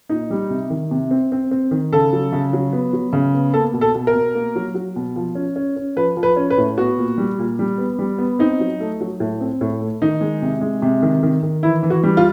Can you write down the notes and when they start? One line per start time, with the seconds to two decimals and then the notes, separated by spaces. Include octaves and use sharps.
0.09 A#2 D#4
0.30 G3
0.50 C3
0.70 D#3
0.91 C3
1.11 C4
1.32 C4
1.51 C4
1.71 D#3
1.93 C#3 A4
2.13 F#3
2.32 C#3
2.53 F#3
2.73 B3
2.93 F#3
3.13 C#3
3.34 B3
3.53 A#3 A4
3.74 B2
3.81 A4
3.95 B2
4.07 A#4
4.14 B2
4.35 A#3
4.56 F#3
4.75 F#3
4.96 B2
5.16 F3
5.35 C#4
5.56 C#4
5.76 C#4
5.96 F3 B4
6.17 F3
6.23 B4
6.36 C#4
6.50 B4
6.58 A2
6.78 B3 F#4
6.98 A#2
7.18 G3
7.38 A#2
7.59 G3
7.78 B3
7.99 G3
8.18 B3
8.39 C4 D#4
8.60 F#3
8.80 A3
9.01 F#3
9.20 A2
9.41 C4
9.61 A2
9.81 A3
10.02 D#3 D#4
10.21 G#3
10.42 C3
10.61 G#3
10.82 C3
11.02 D#3
11.23 D#3
11.43 D#3
11.63 E3 E4
11.83 E3
11.90 F#4
12.04 G3
12.17 F4